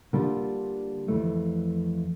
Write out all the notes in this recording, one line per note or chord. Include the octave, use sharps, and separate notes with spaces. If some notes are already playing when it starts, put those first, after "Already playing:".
D3 G3 A#3 D4 F4
F2 E3 A3